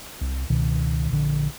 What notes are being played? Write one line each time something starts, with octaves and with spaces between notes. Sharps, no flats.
C2
C#2 B2 D#3
A#1 D3